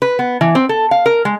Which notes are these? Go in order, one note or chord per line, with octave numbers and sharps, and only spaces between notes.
B4
B3
E3
C4
A4
F5
A#4
G#3